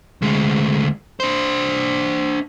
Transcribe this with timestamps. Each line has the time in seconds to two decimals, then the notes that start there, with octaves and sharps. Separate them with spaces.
0.22 D2 G#3
1.20 D4 C5